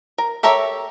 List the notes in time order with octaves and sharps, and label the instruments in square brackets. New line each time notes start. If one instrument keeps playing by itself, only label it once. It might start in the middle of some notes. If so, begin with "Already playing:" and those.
[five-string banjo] A#4
G4 A4 A#4 C#5 E5